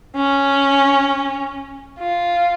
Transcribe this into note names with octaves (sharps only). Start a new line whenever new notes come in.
C#4
F4